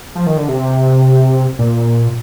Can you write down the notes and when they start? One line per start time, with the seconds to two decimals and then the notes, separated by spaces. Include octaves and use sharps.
0.15 F3
0.26 D#3
0.37 D3
0.48 C3
1.59 A#2